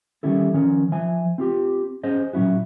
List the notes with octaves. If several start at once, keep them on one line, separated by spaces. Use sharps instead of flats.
D#3 G3 C#4 E4 A4
D#3 F3 C#4 A#4
F3 E5 G#5
C4 F4 G4
C#4 G#4 C5 D#5
A#2 F#3 C#4 E4 F#4